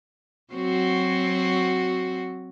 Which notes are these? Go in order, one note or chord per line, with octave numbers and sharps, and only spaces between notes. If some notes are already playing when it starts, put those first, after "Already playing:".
F#3 C4 F#4